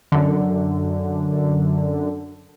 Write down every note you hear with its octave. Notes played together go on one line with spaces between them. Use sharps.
F#2 D3